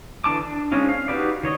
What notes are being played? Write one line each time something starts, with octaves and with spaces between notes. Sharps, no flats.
D3 E3 D4 A5 D6
D4
G#3 C4 C#4 D#4 F4
F5
D#4 F#4 G4 B4 D5
D#3 C#5 D#5